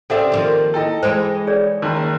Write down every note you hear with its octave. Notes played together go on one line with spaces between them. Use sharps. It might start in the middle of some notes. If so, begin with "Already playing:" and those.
C#3 C4 C#4 G4 A4 D5 E5 F#5
D#3 F3 A#3 C6
E4 A4 D#5 G5 A5
E3 G#3 D#4 C5 G5
G#4 C#5 D5
F#1 D#3 A5 A#5